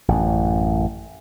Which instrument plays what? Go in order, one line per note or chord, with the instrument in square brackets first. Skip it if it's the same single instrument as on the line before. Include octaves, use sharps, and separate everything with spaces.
[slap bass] A1 F#2